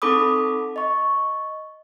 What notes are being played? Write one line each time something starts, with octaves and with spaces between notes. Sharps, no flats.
C4 D#4 A4 B5 D6 D#6
D#5 C#6